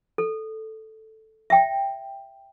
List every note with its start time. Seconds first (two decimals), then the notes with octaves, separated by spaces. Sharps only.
0.18 A4
1.50 E5 G5